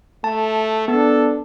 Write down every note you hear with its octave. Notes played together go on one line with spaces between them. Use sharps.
A3 A5
B3 D4 A4